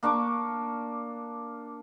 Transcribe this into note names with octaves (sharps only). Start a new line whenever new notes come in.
A#3 D4 C#6 D6